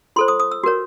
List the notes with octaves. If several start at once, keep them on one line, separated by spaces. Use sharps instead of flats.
F4 A4 C5 C6
D#6
D#6
E6
F#4 A#4 C#5